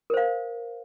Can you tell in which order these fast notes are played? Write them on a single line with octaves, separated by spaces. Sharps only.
A#4 C5 F5